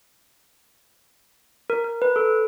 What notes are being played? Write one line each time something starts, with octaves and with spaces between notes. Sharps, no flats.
A#4
A#4
B4
A4